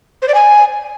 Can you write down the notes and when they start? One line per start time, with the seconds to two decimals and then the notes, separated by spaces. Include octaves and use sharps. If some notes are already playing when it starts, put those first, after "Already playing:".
0.22 C5
0.28 D5
0.34 G#5